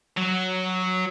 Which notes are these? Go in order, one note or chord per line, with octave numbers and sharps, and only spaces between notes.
F#3